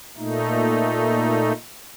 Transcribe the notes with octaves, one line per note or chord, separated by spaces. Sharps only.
A#2 A3 D#4